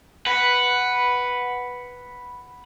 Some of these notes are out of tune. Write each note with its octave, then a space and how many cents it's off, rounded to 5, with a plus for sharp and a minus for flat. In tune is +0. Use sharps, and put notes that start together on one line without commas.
B4 +0 F#5 +0